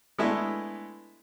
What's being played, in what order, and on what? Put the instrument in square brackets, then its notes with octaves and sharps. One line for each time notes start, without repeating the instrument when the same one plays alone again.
[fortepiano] G#3 A3 B3 D4 E4